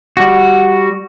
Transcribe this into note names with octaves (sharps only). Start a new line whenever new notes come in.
G3 F#4